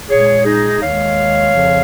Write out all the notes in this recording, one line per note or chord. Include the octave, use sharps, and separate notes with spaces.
A#2 G#3 G#4 C#5
D#4 G#4
D#2 D#3 G#3 C#5 F5
F2 C#3 F3